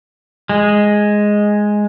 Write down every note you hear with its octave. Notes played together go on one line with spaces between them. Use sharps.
G#3